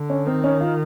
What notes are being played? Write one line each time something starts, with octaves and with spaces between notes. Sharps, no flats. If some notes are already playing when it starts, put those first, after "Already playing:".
Already playing: D3
C#4
D#3 C4
C#4
F4